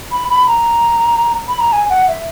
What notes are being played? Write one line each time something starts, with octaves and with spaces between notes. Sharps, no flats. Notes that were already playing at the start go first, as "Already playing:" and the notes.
B5
B5
A#5
B5
A#5
G#5
F#5
E5